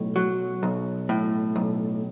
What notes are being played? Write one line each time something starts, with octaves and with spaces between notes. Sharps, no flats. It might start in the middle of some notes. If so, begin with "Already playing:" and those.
Already playing: B1 A2
F#3
B1
A2
B1